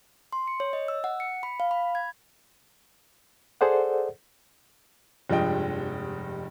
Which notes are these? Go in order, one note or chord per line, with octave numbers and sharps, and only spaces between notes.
C6
C#7
C#5
D#5
E6
F#5
C#7
B5
F5
B5
G#6
G#4 A4 C5 D5 F#5
F1 G2 F3 G#3 D#5 G5